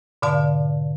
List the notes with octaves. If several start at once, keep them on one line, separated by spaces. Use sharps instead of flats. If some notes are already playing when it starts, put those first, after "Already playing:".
G#2 B2 D3 D5 F5 A5